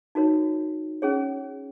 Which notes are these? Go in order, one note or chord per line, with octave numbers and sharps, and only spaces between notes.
D#4 F#4 A#4 C#5
C#4 G#4 C#5